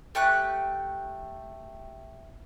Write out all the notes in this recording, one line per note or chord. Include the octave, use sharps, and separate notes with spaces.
A3 G4 C#6 F#6